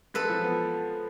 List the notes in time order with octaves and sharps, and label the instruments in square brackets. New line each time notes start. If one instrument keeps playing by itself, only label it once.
[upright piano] G#3 [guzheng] A4 B4
[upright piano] F3
B3